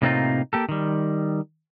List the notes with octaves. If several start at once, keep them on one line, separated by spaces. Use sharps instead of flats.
A2 C3 A#3 C4 D#4 F4
A#3 G4 A4
D#3 G3